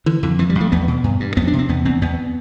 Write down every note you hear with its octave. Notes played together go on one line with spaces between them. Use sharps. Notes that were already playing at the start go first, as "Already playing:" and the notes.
D3 E3
F2 D3
F2 E3
G3
F2
A3
E2 B3
B2
G2
G2
F2 B3
D4
C3
C4
E2 B3
E2 C4
E2 B3